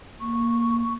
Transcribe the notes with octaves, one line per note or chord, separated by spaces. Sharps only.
A#3 C#6